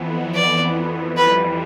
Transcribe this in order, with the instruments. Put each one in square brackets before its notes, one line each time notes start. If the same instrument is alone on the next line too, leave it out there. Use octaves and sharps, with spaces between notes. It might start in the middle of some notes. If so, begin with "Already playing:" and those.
Already playing: [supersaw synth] F2 E3 B3
[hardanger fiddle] D5
[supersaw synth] F2 E3 G3 [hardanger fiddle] B4